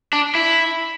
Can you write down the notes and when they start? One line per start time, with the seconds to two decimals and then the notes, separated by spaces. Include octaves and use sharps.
0.13 D4
0.35 E4